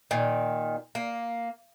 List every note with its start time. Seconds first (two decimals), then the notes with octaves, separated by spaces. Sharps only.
0.11 A#2 D#3
0.95 A#3